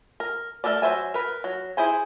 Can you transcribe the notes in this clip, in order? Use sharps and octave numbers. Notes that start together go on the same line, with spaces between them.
A#4
A3 D4 A4 A#4 D5
F#3 C5 E5 G#5
A#4 B4
F#3
E4 G#4 C5 G#5